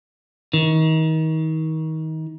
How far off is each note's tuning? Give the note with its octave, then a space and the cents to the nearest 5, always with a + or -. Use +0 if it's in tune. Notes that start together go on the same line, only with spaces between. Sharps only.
D#3 +30